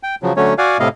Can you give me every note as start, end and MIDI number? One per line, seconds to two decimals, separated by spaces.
0.03 0.15 79
0.23 0.33 49
0.23 0.33 53
0.23 0.33 54
0.37 0.54 50
0.37 0.54 54
0.37 0.54 57
0.37 0.54 61
0.37 0.54 73
0.58 0.77 66
0.58 0.77 74
0.58 0.77 77
0.58 0.77 78
0.58 0.77 80
0.80 0.89 45
0.80 0.89 48
0.80 0.89 64
0.80 0.89 75
0.80 0.89 77